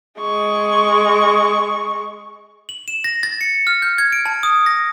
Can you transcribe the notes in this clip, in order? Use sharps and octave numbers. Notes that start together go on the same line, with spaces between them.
G#3 C#6
F#7
E7
A#6
A6
C#7
F6
G6
G#6
D7
A5
D#6
A#6